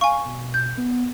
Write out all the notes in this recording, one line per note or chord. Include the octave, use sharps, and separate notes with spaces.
F5 G#5 C#6
B2
G6
B3